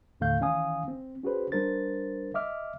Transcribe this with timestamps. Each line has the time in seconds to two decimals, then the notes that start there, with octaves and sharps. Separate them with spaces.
0.20 D#2 A2 D3 A3 F5 G6
0.40 D#3 E3 C#4 F5 G#5 D#6
0.88 C4
1.23 C#4 F#4 G#4 B4 C5
1.52 G3 D4 A#4 C5 A6
2.34 D#5 E5 D6 F6